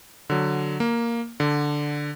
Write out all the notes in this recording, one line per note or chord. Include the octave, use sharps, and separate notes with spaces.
D3 F#3
A#3
D3